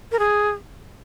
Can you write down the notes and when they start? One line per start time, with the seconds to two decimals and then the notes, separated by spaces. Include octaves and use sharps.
0.12 A#4
0.19 G#4